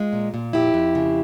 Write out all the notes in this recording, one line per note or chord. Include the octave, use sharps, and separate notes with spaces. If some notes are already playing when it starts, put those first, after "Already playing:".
Already playing: G#3 F4
A#2
A#2
F2 E4 G4
F2
C#3